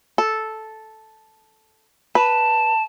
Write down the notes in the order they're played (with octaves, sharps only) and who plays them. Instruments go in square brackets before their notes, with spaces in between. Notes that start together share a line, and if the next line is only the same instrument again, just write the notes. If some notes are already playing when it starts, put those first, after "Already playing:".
[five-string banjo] A4
[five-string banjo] B4 [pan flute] A5